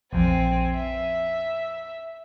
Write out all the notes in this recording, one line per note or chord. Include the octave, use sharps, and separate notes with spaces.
A#1 F2 C4 G#5
E5